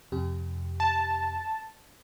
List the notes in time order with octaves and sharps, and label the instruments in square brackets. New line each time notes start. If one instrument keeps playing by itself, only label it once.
[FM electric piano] F2 C3 G4
[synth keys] A5